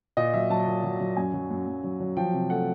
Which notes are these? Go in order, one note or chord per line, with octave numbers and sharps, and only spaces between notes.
A#2 D#5
F#3 E5
F#3 A5
A#2
F#3
F#3
F#2 G#5
F#3
F#2
F#2
F#3
F#3
F3 G5
C3
A3 F#5